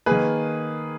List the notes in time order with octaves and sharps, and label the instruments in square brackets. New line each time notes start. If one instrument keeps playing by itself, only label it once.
[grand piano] D#3 A#3 G#4 B4